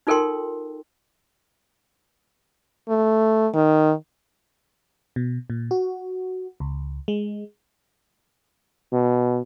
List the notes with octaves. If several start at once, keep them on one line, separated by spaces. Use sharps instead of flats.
D#4 F4 A4 A#4 G5 C6
A3
D#3
B2
A#2
F#4
C#2
G#3
B2